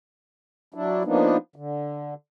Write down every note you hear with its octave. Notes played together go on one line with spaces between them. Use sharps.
F#3 D4 E4
F3 A#3 B3 D4 D#4
D3